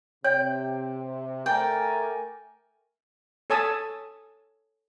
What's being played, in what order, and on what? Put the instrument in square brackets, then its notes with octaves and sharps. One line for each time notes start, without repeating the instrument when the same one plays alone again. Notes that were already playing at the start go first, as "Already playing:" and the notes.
[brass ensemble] C3 [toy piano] C#5 [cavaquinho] G5
[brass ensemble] A3 A#4 G#5 [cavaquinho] D5 G5
[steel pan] A4 C#5 G#5 A5 D#6 E6